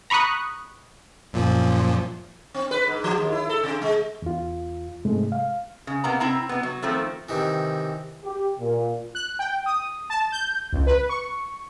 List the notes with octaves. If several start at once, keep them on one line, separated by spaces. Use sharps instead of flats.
A#5 B5 C#6 D#6 F#6
F#2 A#2 F3
C4
B4
G#2
F3
D#2
E4
A4
C3
G#3
E2 F4
G#2 C3 G#3 A3
F5
C#3
C3 A#3 B3 A#5
C4 E4 A#5
C3 B3
F#3
D#3 F3 A3 C4
C3 D#3 E3
G4
A#2
F#6
G5
D#6
A5
G6
C#2
B4
C#6